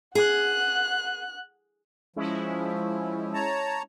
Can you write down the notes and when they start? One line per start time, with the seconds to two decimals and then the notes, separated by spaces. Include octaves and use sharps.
0.15 G#4 F#5 F#6
2.16 F3 G#3 C#4 E4
3.34 C#5 A5 A#5